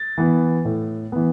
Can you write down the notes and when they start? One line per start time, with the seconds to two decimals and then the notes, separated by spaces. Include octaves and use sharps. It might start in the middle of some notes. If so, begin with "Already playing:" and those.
Already playing: A6
0.18 E3 B3
0.65 A2
1.12 E3 B3